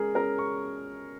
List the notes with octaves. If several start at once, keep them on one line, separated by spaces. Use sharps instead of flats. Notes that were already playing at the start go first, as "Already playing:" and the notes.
Already playing: G#3 C#4 G#4 A#4
C#4 A#4
C#6